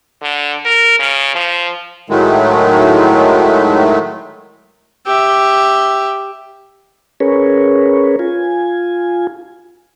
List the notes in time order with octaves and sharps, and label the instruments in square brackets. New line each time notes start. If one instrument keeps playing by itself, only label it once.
[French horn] D3
A#4
C#3
F3
[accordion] A2 D#3 F#3 G#3 A3
[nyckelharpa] G4 E5
[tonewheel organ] C#4 G#4 A#4 B4 C#5
F4 G#5